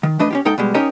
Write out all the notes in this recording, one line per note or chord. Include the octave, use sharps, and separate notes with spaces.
D#3
E3 A3 D4 B4 D#5
C#4 F4 G4
G#2 D#4 A4 G5
B2 G3 G#3
C#4 D#4 G4 A#4 C#5 D#5